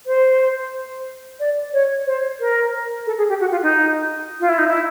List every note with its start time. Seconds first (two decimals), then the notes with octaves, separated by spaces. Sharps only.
0.07 C5
1.40 D5
1.73 C#5
2.07 C5
2.40 A#4
3.07 A4
3.18 G#4
3.29 G4
3.40 F#4
3.51 F4
3.63 D#4
4.40 F4
4.49 E4
4.58 D#4
4.68 E4